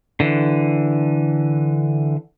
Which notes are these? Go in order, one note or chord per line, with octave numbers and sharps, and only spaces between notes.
D3 E3